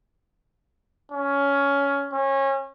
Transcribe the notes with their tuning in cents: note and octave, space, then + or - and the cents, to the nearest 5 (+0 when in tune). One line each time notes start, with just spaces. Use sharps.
C#4 +15
C#4 -25